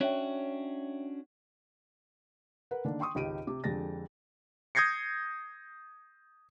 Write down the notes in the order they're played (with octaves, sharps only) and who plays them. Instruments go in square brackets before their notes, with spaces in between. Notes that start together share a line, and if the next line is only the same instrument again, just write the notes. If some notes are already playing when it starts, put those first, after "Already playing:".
[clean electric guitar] C#4 D4 F#4 [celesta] C#5 E5 G5
[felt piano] A#4 B4 F#5
D3 D#3 A#3 D4
G5 C6 C#6 D#6
G#1 C#2 G4 D7 D#7
C3 D6
F2 D3 G#3 G4 A6 A#6
[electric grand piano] D#6 G6 G#6 A#6 C7 C#7